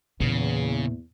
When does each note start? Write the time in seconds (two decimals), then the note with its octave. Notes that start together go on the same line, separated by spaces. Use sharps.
0.21 E2 A#2 C#3